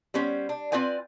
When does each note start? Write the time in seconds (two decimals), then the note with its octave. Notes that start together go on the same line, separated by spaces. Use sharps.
0.14 G3 B3 C#4 C5
0.49 D4
0.72 C4 F4 B4 D5 G#5